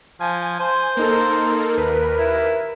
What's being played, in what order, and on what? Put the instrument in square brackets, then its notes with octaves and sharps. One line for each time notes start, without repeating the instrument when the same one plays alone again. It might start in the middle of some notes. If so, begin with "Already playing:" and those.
[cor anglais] F3 [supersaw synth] G#5
[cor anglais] C5
[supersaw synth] A#3 D#4 A4 [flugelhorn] A#4
[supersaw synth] D#2 B4
[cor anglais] E4